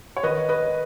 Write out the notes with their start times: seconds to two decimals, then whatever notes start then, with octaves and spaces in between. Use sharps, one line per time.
0.17 C#5
0.23 D#3 B4 D#5
0.49 B4 D#5